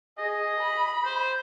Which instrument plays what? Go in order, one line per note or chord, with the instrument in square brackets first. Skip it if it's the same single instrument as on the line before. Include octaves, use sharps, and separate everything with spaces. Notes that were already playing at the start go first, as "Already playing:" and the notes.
[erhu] G#4 [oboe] D#5
[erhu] B5
[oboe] C5